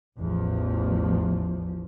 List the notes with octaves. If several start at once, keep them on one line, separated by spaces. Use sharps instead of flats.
A1 E2 F3